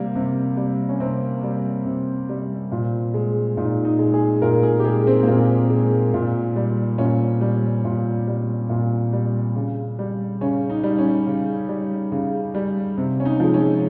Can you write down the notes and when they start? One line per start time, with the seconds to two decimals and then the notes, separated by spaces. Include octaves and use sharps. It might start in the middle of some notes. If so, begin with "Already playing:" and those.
Already playing: C3 G3 A#3
0.15 C3
0.57 G3
0.89 C#4
1.00 C3 C4
1.43 G3
1.85 C3
2.29 G3
2.72 A#2
3.14 G#3
3.57 A#2 D#4
3.85 D#4
3.99 G#3
4.14 G#4
4.42 A#2 A#4
4.63 G#4
4.80 G4
4.85 G#3 G#4
5.07 C4
5.23 A#3
5.27 A#2 C4
5.70 G#3
6.14 A#2
6.56 G3
6.98 A#2 C#4
7.41 G3
7.85 A#2
8.27 G3
8.69 A#2
9.13 G3
9.56 C#3
9.99 G3
10.41 C#3 C#4
10.70 D#4
10.83 G3
10.98 C#4
11.27 C#3
11.69 G3
12.12 C#3
12.54 G3
12.97 C3
13.20 C#4
13.25 D#4
13.40 F3 G#3
13.54 C#4